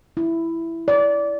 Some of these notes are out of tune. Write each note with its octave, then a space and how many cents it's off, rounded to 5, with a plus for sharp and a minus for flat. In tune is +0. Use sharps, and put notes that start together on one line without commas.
E4 +5
D5 -20